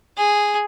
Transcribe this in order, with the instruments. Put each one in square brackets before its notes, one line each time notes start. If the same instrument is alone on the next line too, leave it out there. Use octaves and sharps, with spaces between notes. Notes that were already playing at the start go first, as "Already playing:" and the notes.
[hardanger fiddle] G#4